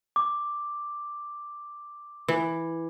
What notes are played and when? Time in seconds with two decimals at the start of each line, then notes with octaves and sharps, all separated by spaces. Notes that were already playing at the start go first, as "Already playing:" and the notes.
0.16 D6
2.28 E3